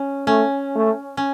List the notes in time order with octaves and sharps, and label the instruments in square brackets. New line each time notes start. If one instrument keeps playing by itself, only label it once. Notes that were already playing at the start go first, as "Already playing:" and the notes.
Already playing: [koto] C#4
[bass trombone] A3 [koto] C#4
[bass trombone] A3
[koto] C#4